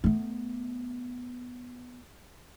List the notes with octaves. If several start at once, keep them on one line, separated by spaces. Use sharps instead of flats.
A3 B3